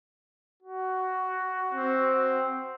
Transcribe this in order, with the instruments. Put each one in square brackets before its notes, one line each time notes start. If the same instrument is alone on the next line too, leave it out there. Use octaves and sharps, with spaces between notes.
[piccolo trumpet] F#4
[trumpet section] C4